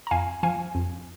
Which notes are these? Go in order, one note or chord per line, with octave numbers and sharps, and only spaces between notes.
A#5
F2 F5 G#5
F3 F5 G#5
F2